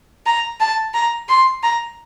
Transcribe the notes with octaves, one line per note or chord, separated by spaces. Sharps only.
A#5
A5
A#5
C6
A#5